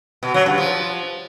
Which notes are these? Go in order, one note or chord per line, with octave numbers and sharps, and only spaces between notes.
B2
F#3
G2
F3